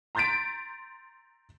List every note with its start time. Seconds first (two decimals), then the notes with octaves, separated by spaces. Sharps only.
0.15 A#5 C6 G6 A6 B6 D7